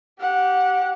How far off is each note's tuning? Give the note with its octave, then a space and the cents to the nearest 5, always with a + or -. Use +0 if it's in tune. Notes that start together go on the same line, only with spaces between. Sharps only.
G4 -20 F#5 -15